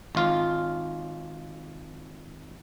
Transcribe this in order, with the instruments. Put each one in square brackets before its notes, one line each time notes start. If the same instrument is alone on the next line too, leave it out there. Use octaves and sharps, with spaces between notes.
[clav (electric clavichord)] G#1 F4